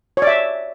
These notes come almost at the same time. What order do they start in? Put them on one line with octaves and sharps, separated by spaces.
C#5 D5 E5